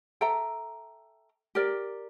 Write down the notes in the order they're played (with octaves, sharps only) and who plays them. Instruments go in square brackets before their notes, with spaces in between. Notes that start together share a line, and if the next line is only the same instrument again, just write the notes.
[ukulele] A4 E5 G5 A#5
G4 A#4 D5